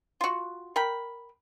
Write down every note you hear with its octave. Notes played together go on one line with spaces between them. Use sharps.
F4 F#4
A#4 G5 B5